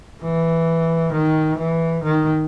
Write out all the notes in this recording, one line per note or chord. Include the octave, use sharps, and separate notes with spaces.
E3
D#3
E3
D#3